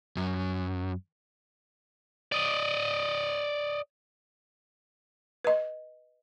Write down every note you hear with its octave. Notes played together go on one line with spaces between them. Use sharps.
F#2
D5 D#5
B4 D#5